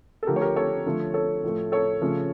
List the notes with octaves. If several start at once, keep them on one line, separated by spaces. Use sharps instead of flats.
A4
D3 F3 A3 G4 A#4
C#5
G4 A#4
A4 C#5
D3 F3 A3
A4 C#5
A2 F3 A3
A4 C#5
C#3 F3 A3